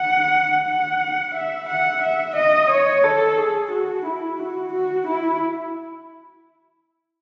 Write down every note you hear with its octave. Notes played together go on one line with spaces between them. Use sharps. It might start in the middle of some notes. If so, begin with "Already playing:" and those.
Already playing: F#5
F#5
E5
F#5
E5
D#5
C#5
A4
G#4
F#4
E4
F#4
F#4
E4